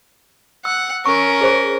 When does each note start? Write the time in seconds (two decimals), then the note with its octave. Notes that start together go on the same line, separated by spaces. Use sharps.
0.65 F#5 E6
1.06 C#4 A#4 C#6
1.41 G#4 C5